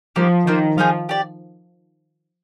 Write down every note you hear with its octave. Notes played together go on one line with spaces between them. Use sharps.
F3 A#3 D#4 G4
D#3 A#3 F4 C5
F3 D#4 G#4 C5 F5
G4 D5